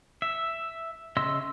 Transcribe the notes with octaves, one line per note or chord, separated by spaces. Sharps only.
E5
C#3 D#5 E5 C6 E6